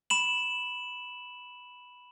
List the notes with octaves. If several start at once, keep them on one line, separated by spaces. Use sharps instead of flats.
B5 E7 F#7